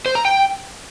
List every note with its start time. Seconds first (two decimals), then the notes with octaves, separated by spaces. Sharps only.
0.06 C5
0.15 A#5
0.25 G5